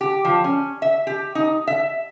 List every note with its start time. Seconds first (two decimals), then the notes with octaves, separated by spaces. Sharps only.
0.01 G4
0.25 F3
0.44 C#4
0.82 E5
1.07 G4
1.35 D#4
1.67 E5